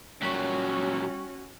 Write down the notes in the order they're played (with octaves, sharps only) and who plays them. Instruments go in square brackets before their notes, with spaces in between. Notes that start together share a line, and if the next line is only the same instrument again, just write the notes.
[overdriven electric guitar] A#2 F#3 [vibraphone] G3 C#5 C#6 [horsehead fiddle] C#4 F#4